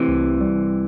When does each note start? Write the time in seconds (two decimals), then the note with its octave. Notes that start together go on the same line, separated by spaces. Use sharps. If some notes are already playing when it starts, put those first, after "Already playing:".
Already playing: C3 E3 A3 C4
0.08 C2
0.41 G3